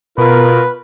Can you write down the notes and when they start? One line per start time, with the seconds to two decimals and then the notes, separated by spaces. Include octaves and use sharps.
0.18 B2 F4 A#4 B4